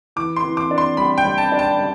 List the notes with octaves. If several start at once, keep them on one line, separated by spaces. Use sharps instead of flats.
E3 D6
C6
E3
D6
D4
C6
G3 B5
G5
G3
A5
D4
A5
G3